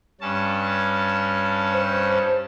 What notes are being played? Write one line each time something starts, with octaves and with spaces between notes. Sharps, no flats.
G2 C#4 A5
C5